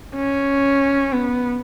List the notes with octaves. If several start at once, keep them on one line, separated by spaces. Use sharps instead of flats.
C#4
B3